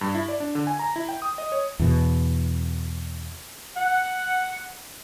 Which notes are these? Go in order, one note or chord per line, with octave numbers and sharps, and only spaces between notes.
G2
E4
D5
D4
D3
G#5
A#5
E4
G5
D#6
D#5
C#5
E2 B2
F#5